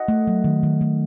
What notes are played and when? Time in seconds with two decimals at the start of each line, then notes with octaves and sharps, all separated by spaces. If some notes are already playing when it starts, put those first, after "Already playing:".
Already playing: D#5 F#5
0.08 A3
0.27 F#3
0.44 D#3
0.63 D#3
0.81 A3